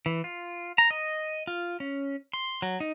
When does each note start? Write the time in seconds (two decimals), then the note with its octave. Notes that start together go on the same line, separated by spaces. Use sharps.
0.06 E3
0.24 F4
0.78 A#5
0.91 D#5
1.47 F4
1.80 C#4
2.33 C6
2.62 F#3
2.80 D#4